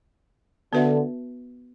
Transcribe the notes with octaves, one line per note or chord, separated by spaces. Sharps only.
D3 B3 F#4 B4 E5